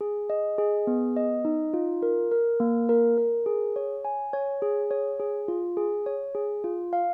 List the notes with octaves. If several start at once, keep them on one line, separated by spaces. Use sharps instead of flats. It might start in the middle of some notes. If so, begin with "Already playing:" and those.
G#4
D#5
G#4
B3
D#5
D#4
F4
A#4
A#4
A#3
A#4
A#4
G#4
C#5
G#5
C#5
G#4
C#5
G#4
F4
G#4
C#5
G#4
F4
F5